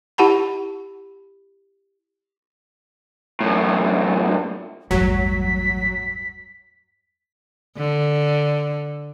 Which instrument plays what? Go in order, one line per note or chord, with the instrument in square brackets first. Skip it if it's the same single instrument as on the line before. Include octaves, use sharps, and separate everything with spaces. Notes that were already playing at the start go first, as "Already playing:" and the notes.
[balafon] E4 G4 F#5 A5 B5
[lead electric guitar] F#2 A2
[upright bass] A1 [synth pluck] E2 G2 G3 [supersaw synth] F#3 [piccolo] B6
[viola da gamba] D3